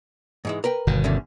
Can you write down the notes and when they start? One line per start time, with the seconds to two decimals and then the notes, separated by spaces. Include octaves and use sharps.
0.45 G#2 E3 G#3
0.64 A#4 B4 G5
0.87 G1 B2 D#3
1.04 E2 D3 C#4